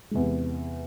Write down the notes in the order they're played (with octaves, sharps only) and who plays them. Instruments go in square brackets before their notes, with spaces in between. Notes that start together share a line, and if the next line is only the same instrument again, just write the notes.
[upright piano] E2 C3 G#3